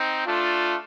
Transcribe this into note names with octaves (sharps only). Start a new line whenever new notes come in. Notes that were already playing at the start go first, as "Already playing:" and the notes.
Already playing: C4 D#4
A3 D4 F4